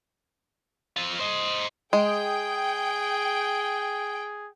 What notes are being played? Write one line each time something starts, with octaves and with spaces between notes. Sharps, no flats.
C4 F4
C5 D#5
G#3 G#4 G5